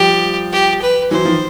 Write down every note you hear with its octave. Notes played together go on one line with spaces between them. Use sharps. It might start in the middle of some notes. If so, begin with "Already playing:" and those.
Already playing: F3 G3 G4
G4
B4
E3 F#3 C5
D#3 F3